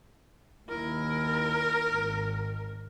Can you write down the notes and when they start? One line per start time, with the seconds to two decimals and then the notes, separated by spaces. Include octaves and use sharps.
0.69 D#2 E4 A#4
1.89 G#1